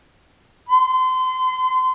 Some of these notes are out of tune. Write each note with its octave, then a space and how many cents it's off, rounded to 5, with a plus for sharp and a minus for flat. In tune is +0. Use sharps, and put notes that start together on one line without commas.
C6 -30